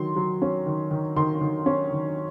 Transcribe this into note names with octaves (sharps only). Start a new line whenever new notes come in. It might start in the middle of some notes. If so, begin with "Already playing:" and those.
Already playing: D#3 F#3 C6
F#3
C#4
D#3
D#3
D#3 C6
D#3
C#4
D#3